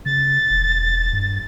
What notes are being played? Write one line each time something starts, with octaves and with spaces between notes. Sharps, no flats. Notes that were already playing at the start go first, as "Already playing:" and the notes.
C#3 A6
E1
G2